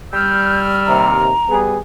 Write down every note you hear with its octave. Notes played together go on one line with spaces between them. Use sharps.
G3 E6 F6 G6
D#2 C3 A#5
G3 B3 G#4